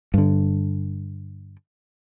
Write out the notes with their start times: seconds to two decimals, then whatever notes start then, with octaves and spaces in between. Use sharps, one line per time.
0.14 G2 D3